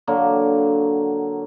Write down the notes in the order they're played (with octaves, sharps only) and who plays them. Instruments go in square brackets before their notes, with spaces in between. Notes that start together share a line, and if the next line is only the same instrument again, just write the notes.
[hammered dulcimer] D3 F#3 A#3